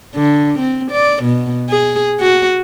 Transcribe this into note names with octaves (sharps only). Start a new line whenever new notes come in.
D3
C4
D5
B2
G#4
F#4